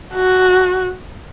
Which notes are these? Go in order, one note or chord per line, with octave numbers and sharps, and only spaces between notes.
F#4